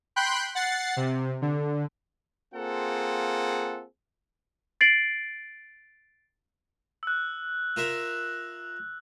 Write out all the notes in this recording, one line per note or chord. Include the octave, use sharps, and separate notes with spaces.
G5 B5 C6 F#6 G6
F#5 A6 C7
C3
D3
A#3 C4 F4 G#4 A4 F#5
A6 C7 D7 F#7
E6 F#6
F4 A#4 E5